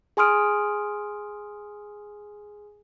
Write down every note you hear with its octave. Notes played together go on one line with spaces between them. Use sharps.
G#4 G#5 C6 D#6 F6 D7